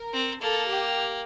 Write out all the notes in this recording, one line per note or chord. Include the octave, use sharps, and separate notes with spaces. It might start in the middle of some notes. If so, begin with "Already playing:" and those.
Already playing: A#4
C4
A#3 A4
G4